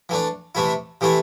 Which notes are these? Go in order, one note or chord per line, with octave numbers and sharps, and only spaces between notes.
E3 A3 D4
C3 E3 A3 E4
C3 E3 A3 E4